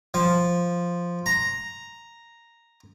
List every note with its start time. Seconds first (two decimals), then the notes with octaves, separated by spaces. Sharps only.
0.14 F3
1.26 A#5